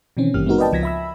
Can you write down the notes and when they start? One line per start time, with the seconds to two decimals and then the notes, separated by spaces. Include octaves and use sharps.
0.17 B2 D#3 E3 C4 C#4
0.34 G#1 G2 E3 A#3 G4 F6
0.46 G#3 B3 C4 D#4 F#4 A#4
0.58 B4 D5 D#5 G5 A5
0.72 C#2 F3 G#6 A#6 B6
0.83 E5 B5 E6